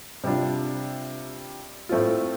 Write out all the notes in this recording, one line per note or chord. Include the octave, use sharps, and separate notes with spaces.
C3 G3 D4 F4
A2 A3 C4 F4